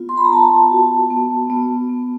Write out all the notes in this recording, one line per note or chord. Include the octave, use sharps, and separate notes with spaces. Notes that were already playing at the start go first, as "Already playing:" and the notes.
Already playing: B3 F4
C6
B5
A#5
B3 A5
F#4
B3
B3
B3